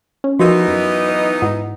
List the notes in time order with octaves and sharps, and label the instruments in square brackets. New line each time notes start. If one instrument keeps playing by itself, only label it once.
[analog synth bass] C#4
[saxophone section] E3 B3 D#4 [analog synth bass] F3 [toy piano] F#4 G4 A#4
[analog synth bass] F#2
[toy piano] B4
[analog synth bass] G#2 [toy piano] E4 F#5